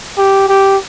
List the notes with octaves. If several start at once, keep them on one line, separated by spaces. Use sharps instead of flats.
G4
G4